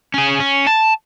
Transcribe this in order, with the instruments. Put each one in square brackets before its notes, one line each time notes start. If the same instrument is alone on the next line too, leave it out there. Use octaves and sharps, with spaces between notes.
[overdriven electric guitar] C#4 G#4
C#4
A5